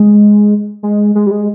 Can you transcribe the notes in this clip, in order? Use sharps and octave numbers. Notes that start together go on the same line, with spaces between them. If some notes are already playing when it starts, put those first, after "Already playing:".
Already playing: G#3
G#3
G#3
G3
G#3